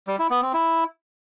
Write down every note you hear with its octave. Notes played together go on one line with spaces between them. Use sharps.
G3
E4
B3
C4
E4